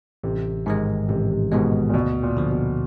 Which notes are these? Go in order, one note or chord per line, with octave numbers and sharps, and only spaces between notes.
A1 C3
G#2 D#3 G#3
A1 C3
C3
G#2 B2 D#3 G#3
A#2
D2 B2
A#2
D3 F3
B2